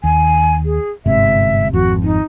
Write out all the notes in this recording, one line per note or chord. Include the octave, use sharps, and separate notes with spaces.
D#2 G#5
G#4
G1 G#2 C3 E5
G#1 F2 F#4
D#4